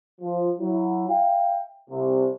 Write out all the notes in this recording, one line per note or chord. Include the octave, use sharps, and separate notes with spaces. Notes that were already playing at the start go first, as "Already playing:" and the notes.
F3
F#3 E4
E5 F5 G5
C2 C3